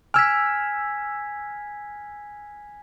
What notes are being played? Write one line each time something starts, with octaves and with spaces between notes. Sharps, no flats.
G#5 E6 F6 G#6 B6